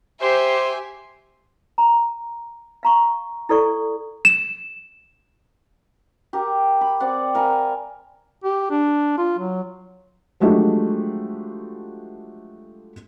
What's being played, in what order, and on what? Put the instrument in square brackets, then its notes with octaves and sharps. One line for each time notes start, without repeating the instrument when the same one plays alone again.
[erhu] G4 [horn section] C5 [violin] E5 G#5
[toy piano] A#5
F5 A#5 C#6
E4 A4 D5 C#6
[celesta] E7
[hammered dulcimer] G4 A#4
B5
C4 D5 F#5 D6
A#4 F5 G#5 B5
[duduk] G4
D4
F4
F#3
[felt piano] F3 F#3 G#3 A3 D4 G4